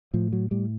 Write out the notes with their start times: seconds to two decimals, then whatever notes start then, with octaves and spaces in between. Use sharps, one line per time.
0.14 A2 F3
0.32 F#3
0.51 A2 G3